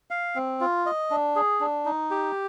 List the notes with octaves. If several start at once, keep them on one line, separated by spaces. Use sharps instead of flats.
F5
C4
F4
D#5
D4
G#4
D4
D#4
G4